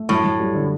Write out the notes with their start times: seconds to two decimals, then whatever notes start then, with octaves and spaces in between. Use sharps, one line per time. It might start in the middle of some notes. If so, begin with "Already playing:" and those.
Already playing: A3
0.09 F#2 A2
0.24 F#2
0.40 G3
0.54 D3